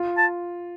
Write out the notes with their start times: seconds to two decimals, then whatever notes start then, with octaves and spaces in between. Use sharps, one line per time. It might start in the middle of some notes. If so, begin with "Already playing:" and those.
Already playing: F4
0.18 A5